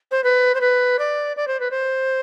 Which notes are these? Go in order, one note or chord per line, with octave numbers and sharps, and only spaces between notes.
C5
B4
C5
B4
D5
D5
C5
B4
C5